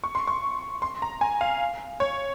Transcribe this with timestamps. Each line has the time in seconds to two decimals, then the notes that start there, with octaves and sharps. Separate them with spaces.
0.04 C#6
0.15 C6
0.27 C#6
0.82 C6
1.02 A#5
1.21 G#5
1.41 F5
2.00 C#5